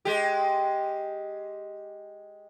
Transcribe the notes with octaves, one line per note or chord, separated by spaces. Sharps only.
G#3 G4